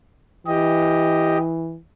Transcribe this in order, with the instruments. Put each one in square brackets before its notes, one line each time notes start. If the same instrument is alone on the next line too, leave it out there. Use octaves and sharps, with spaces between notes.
[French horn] E3 [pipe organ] G4 D#5